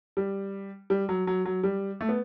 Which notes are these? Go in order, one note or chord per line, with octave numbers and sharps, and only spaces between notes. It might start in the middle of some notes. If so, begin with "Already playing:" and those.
G3
G3
F#3
F#3
F#3
G3
A3
B3